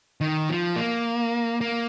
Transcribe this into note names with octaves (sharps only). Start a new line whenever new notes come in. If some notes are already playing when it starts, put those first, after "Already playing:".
D#3
F3
A#3
A#3